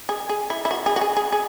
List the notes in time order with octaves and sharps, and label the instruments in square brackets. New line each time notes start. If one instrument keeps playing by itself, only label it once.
[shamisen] G#4
G#4
E4
E4
F#4
G#4
F#4
G#4
G#4
G#4